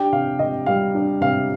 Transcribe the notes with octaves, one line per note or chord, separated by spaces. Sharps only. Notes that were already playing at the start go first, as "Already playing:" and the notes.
Already playing: D4 G4 G5
C3 F5
C3 D#5
G3 F5
D4
C3 F5